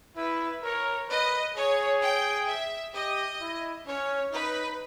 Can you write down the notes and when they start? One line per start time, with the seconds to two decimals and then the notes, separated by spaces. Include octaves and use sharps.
0.17 E4 B4
0.64 A#4 C#5
1.09 B4 D#5
1.56 G#4 C#5
2.03 G5
2.48 E5
2.95 G4 D#5
3.41 E4
3.86 C#4 C#5
4.32 D#4 B4